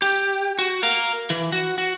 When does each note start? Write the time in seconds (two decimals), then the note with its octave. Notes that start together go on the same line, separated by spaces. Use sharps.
0.02 G4
0.59 F#4
0.83 A#4 F5
1.30 E3
1.52 F#4
1.78 F#4